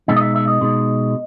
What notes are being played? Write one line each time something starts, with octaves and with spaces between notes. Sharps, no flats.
B2 G#3 D#4 E5
D#5
E5
E5
D#5
B2 G#3 D#4